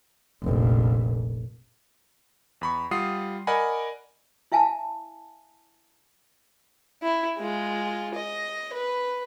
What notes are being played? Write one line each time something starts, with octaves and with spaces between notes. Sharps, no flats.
F1 A#1
E2 B5 C#6
G3 F4 F#5 D#6 C7
A#4 D5 D#5 F#5 G#5 B5
E4 E5 F5 G#5 A5
E4
G#3 F4
D#5
B4